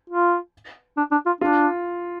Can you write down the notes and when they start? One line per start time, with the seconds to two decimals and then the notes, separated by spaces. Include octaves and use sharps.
0.10 F4
0.97 D4
1.12 D4
1.26 F4
1.41 D4 F4